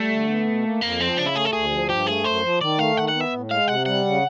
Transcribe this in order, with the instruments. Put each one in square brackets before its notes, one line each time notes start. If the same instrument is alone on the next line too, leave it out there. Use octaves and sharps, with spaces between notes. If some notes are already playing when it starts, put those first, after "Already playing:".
Already playing: [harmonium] G3 [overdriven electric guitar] A3
[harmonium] D3
B3
B2
A#3
[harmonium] F2 [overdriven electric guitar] A#3
[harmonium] F3 [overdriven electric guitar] C4
[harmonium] C#3 [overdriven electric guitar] D4
[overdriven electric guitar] E4
[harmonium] A3 [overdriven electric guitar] G#4
[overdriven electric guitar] A4
[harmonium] D2 [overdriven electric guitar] G#4
[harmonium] F3
[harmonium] G2 [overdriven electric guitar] G4
[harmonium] A3 [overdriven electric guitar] G#4
[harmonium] F#2 [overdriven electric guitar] C5
[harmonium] F3
[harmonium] D#3 [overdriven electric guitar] D5
[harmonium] A3 [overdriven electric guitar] F5
[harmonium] D#3 [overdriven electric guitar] F#5
[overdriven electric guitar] F#5
[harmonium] B3
[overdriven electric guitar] E5
[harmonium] A2
[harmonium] G#3 [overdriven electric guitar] F5
[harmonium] C3 [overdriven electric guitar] F#5
[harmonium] G3 [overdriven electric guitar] F#5
[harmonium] C#3